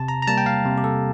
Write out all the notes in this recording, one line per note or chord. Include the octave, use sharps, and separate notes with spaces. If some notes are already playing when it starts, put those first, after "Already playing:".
Already playing: C3 A5
A#5
A#5
G3 A#3 A5
G5
F5
C3
G4
A4